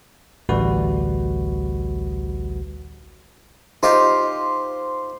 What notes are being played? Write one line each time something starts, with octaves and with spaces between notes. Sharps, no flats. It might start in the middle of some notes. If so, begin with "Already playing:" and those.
A1 D2 G3 F#4 B4
D#4 F4 G4 C5